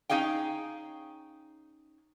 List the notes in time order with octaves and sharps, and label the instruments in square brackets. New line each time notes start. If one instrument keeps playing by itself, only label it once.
[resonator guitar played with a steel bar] C#4 D#4 G#4 F5 G5